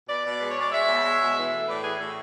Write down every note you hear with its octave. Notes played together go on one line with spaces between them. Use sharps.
B2 B4 D5
B2
G#3 B4
C#5
G#3 D5
G#3 C#5 E5
B2
G#3
B2
E3
A3
A2 B4 D5
E3 G#4 B4
A2 F#4 A4